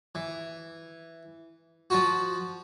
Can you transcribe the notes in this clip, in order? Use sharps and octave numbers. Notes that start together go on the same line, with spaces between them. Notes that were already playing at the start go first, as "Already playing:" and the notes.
E3
F3 F4 F#4